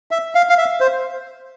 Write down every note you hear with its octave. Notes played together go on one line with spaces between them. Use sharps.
E5
F5
F5
E5
C5